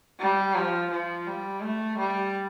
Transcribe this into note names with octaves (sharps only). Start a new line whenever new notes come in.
G3
F3
F3
G3
A3
G3